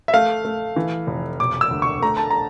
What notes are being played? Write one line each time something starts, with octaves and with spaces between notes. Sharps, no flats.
E5
A3 F5
A3
E3
F1
E1 D6
E6
D2
C#6
A3 A#5
A5
A#5